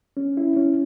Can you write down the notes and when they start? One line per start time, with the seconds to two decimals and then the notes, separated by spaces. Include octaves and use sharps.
0.17 C#4
0.37 E4
0.57 C#4